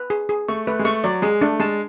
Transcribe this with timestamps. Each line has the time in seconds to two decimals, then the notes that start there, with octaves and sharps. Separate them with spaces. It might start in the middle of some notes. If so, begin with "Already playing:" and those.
Already playing: B4
0.10 G#4
0.29 G#4
0.48 A3 C#6
0.67 A3 B4
0.79 G#3
0.85 A3 C#6
1.04 F#3 D5
1.22 G#3 G#4
1.41 A3 D4
1.60 G#3 A5